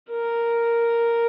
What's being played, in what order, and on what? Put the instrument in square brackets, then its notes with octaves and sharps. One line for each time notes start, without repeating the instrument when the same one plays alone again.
[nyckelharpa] A#4